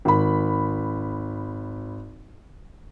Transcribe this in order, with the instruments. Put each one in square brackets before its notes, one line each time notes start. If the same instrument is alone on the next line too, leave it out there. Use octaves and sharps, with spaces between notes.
[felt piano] G#1 B5